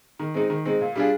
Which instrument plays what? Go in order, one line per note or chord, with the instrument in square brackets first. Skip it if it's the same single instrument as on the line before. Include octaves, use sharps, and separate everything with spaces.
[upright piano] D#3
G#3 C4 D#4
D#3
G#3 C4 D#4
A#2
G3 D4 F4 G#4